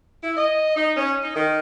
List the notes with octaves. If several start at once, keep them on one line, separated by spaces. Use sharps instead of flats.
E4
D#5
D#4
C#4
D#4
D#3